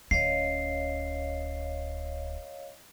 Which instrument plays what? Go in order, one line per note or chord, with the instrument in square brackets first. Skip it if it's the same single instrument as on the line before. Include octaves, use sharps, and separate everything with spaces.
[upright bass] D1 C#4 [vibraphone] C#5 D#5 F5 [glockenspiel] C7